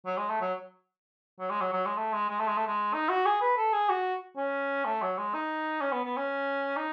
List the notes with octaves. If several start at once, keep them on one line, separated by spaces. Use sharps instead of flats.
F#3
G#3
A3
F#3
F#3
G#3
F#3
F#3
G#3
A3
G#3
G#3
A3
G#3
A3
G#3
D#4
F#4
G#4
B4
A4
G#4
F#4
C#4
A3
F#3
G#3
D#4
C#4
B3
B3
C#4
D#4